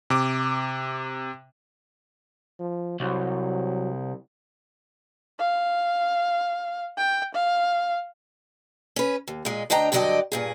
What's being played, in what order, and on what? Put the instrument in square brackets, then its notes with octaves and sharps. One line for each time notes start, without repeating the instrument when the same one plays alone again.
[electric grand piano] C3 D6
[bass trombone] F3
[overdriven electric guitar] C2 [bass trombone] F#3
[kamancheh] F5
G5
F5
[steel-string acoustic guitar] C#4 B4
D#2
A#2 G#3
D2 D4 D#5 G5 A#5
G2 D3 F#3 D5 D#5 G5
G2 A#2 G#4